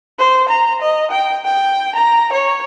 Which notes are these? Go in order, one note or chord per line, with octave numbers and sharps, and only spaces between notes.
C5
A#5
D#5
G5
G5
A#5
C#5